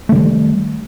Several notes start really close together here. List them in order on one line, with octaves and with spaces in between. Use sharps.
A3 D3 G3 D#3